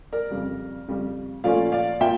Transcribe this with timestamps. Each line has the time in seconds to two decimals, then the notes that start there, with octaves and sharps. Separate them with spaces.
0.13 A#4 D5
0.31 F2 C#3 G3
0.88 F2 C#3 G3
1.44 A#2 F3 A3 C#4 D5 F5
1.72 D5 F5
2.01 A#2 E5 G5